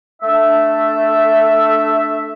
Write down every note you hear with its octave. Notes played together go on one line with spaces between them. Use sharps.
A3 D4 E5